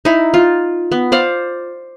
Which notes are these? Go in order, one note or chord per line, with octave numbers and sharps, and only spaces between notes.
D#4 E4
F4
B3
C5 D5 F5